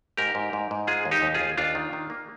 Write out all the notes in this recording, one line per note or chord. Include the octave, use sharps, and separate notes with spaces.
G#2 G4 A#4
G#2
G#2
G#2
G#3 F4 G#4
D#2
D#4 G4
D#2
F4 G#4
D#2
D#2 D4 F4
D#3
D#3
A#3